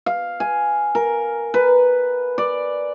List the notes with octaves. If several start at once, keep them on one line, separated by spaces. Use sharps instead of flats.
F5
G#5
A#4
B4
D5